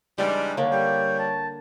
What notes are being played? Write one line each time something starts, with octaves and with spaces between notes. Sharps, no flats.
C#3 E3 G3 G#3 D4 D#4
D3 A#3 C#5
G3 G5
A5